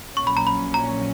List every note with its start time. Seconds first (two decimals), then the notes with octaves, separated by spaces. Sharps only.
0.16 A#1 A#2 F#3 C#4 C#6
0.27 B5
0.37 A#5
0.47 B5
0.74 A#5